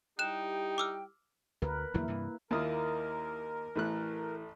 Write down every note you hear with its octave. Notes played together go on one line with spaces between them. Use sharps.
G3 D#4 E4 G4 G5 F#6 E7
D6 E6 F6
D2 A#4 B4
E2 D3 F#3 A#3 E4
G2 C3 E3
D#2 A#3 E4 F4 A#4 D#6
A1 E3 A3 F#6